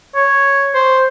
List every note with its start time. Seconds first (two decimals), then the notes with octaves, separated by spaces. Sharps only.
0.15 C#5
0.74 C5